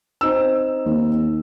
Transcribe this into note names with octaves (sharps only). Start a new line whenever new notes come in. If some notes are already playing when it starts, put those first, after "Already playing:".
C4 D#4 E6
D#2